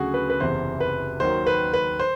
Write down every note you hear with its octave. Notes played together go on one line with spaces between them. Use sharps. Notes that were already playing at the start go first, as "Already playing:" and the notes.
Already playing: D2 C#3 F#3 F#4 G#4
B4
B4
F#1 E2 C3 E3 C5
B4
D#2 D#3 F#3 C5
B4
B4
C5